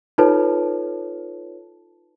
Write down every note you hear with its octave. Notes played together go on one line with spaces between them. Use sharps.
D#4 F4 A4 B4 C#5 A5